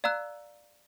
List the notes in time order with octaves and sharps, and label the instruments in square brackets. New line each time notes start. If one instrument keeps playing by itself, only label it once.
[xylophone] D5 F5 A#5 E6 F#6